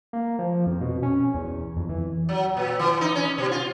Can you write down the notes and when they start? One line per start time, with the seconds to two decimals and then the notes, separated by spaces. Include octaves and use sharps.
0.13 A#3
0.39 F3
0.67 F2
0.81 B2
1.03 C#4
1.34 E2
1.77 F2
1.89 E3
2.29 F#3
2.57 A#2
2.79 E3
3.01 D#4
3.15 C#4
3.38 B2
3.51 F4